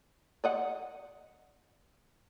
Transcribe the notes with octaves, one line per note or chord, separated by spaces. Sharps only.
D5 D#5 F#5